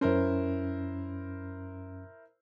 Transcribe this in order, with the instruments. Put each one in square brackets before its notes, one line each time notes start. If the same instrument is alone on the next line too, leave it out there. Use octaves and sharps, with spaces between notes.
[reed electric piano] F#2 C#4 [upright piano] E4 A#4 C5